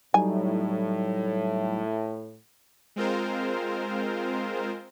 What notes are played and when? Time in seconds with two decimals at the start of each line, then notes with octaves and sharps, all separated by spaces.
0.14 A2 F#3 G3 D#4 G#5
2.96 G#3 C4 F4 A#4 C5